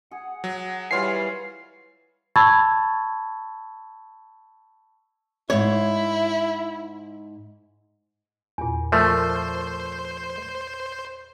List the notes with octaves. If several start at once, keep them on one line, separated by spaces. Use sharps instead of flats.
G#4 F#5
F#3
E3 G3 F4 B4 C#5 G#5 C7
A5 B5 C#6 E6 G#6 A6
E2 G#2 E4 C#5
E2 A#2 F4 G#5
F3 A3 A#4 C5 D5 E5